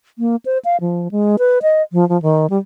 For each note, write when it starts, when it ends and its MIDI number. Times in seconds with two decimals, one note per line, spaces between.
0.19 0.36 58
0.46 0.58 72
0.65 0.77 77
0.81 1.11 53
1.11 1.36 56
1.39 1.59 71
1.62 1.82 75
1.93 2.07 53
2.09 2.20 53
2.22 2.46 51
2.50 2.58 55